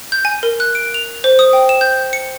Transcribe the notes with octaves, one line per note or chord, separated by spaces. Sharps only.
G6
G#5
A#4
F#6
D7
F7
C5
D#6
G5
E7
G6
C#7